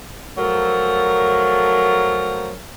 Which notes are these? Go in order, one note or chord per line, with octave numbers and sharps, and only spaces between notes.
F3 F#3 A3 A#4